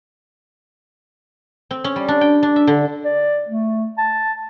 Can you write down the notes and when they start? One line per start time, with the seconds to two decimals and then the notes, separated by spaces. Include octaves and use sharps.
1.71 C4
1.84 C#4
1.96 G3
2.08 D4
2.21 G5
2.43 D4
2.56 E5
2.67 D3
3.04 D5
3.49 A3
3.98 A5